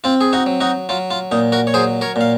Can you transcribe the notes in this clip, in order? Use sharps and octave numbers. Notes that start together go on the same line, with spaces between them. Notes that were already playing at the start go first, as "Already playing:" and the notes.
C4 F4
G#4
D#4 F#4
F#3
D#4 F#4
F#3 F4
F4
A#2 D#4
F#4 A#4
C#5
F#3 G#4 C5
A#4 C#5
A#2 F5